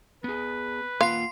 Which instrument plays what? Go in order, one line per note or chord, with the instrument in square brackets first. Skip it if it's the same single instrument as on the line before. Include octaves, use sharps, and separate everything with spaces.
[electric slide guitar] B3 G#4 [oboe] B4
[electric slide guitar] A#3 F4 F#5 [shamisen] F5 [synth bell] C6 C7